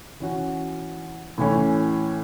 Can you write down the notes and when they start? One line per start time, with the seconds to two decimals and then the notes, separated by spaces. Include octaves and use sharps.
0.20 E3 C#4 F#4
1.38 A2 E3 C#4